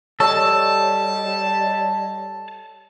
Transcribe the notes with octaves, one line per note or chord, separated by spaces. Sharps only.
G3 A4 C#5 D#5 A5